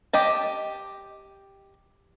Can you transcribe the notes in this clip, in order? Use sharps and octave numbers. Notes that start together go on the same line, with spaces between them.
G4 D#5 A5